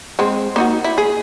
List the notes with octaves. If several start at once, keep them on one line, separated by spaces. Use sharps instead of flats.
G#3 C4
A#3 D#4 F#4
E4
G#4